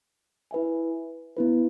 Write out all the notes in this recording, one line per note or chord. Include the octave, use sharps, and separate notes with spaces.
E4 B4 E5 G#5
B3 E4 B4